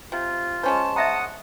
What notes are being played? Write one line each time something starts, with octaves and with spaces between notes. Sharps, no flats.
C3 F4
G#3 C#4 C5 A5
D#5 E5 F#5 A#5 D#6